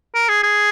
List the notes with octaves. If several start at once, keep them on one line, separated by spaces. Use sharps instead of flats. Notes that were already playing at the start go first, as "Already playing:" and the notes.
A#4
G#4
G#4